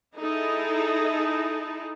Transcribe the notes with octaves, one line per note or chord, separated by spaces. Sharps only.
D#4 E4 G#4 A4